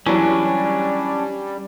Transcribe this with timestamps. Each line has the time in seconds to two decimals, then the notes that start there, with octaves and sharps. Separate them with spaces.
0.06 E3 F#3 G3 C#4 D4